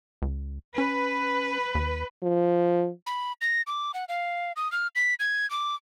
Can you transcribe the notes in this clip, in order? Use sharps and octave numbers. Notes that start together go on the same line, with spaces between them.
C#2
C#4 B4
D#2
F3
B5
A#6
D6
F#5
F5
D#6
F6
B6
G#6
D6